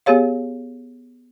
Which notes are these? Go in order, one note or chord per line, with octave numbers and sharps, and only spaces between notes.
B3 G4 G#4 C#5 F5